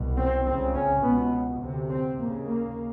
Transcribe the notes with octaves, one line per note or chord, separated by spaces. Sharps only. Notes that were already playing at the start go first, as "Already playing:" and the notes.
Already playing: C2 B2
C4
C#2 C#3 C4
C#4
C#2 B2 B3
D2 C3
C4
D#2 C#3 A#3
A#3